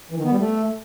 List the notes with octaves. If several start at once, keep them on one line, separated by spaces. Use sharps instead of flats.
E3
D#3
B3
G3
A3